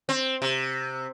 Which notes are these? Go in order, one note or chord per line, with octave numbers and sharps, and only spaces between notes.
C4
C3